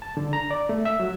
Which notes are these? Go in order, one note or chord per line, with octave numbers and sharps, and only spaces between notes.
A5
D3
A#5
D5
A3
E5
F#3